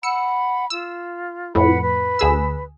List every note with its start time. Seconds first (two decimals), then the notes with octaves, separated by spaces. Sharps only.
0.03 F#5 B5 E6 C#7
0.70 F4 E6
1.55 F2 A2 B4 F#5 B5
1.82 B4
2.19 D2 G#4 E6